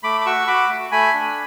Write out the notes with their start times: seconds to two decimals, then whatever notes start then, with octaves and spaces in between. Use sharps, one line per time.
0.03 A3 B5 D6
0.21 D6
0.25 F#4 C#6 E6
0.47 F#4 B5 D6
0.69 A3
0.92 A3 G#5 B5
1.14 D4